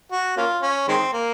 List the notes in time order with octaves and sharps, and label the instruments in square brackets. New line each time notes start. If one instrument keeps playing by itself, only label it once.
[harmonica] F#4
A#3 C#4 F4
C#4
D#3 G#3 C4
A#3